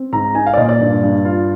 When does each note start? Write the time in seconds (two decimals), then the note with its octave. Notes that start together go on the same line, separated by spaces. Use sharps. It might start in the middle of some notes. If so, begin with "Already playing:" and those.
Already playing: C4
0.12 G#2 A#5
0.35 D#4 G#5
0.46 F5
0.54 D5
0.58 A#2 D#5
0.69 D5
0.80 G2
1.03 G2
1.25 F4